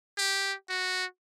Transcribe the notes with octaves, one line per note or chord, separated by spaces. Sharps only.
G4
F#4